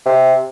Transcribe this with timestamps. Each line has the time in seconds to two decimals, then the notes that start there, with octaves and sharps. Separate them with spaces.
0.06 C3